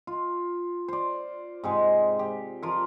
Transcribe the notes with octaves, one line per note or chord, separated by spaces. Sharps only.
F4
C5 D5
G#2 C3 G#3
G4
F3 F4 A#4